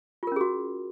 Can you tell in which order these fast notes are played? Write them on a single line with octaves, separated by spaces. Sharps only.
F4 A#4 C#4 G#4 F#4